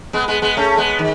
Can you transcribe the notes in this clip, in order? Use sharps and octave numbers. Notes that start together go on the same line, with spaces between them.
G#3 B3
G#3 B3
G#3 B3
A3 C#4
G#3 B3
D#3